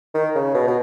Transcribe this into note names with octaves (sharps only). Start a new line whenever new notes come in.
D#3
C#3
B2
B2